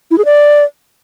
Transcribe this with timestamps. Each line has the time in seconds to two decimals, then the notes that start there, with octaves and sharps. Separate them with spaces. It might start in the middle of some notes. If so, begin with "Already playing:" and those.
0.11 E4
0.18 G#4
0.25 D5